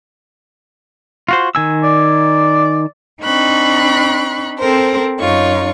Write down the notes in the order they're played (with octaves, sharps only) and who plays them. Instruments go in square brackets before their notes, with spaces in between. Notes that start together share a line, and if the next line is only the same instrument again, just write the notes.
[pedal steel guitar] F4 F#4 C5
D#3 G#5 E6
[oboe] D5
[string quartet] C4 D4 D#4 B5 C#6 F#6
C4 A4 A#4 C5
F#2 D#4 F4 C#5 C#6